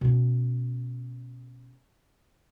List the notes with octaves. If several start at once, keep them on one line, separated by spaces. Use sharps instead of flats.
B2 C#4